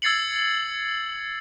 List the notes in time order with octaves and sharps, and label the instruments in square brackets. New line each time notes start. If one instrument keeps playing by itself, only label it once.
[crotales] E6 G#6 A6 C7 C#7 F#7